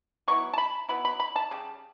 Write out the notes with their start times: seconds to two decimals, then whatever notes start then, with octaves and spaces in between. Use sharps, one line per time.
0.28 F#3 B3 E4 C#6
0.53 A5
0.58 B5
0.88 F#3 B3 E4 B5
1.05 B5
1.20 B5
1.36 A5
1.51 C#3 G3